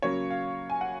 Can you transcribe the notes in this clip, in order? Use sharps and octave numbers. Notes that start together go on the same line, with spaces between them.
C#3 F#3 A#3 C#5
F5
G#5
F#5